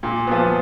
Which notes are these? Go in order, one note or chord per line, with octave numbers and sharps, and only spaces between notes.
A#2
F3 B3